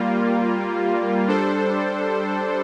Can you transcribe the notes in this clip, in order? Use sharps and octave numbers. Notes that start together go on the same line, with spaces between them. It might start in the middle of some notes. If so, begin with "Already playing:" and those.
Already playing: G3 A#3 F4
G3 D4 A4 C5